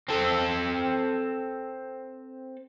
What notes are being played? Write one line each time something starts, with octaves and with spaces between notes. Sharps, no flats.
C4 A4